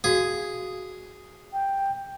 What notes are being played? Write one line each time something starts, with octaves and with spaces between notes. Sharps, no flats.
F#4 G#4 F5
G5